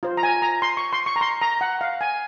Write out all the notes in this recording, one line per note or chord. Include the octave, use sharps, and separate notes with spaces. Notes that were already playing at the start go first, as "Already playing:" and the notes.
F4 C5
A#5
G#5
A#5
C6
C#6
C6
C#6
A#5
C6
A#5
F#5
F5
G#5